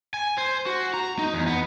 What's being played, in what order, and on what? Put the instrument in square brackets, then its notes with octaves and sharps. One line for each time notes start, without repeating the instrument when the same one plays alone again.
[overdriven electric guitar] G#5
C5
F#4
A#5
D#4
E2
B3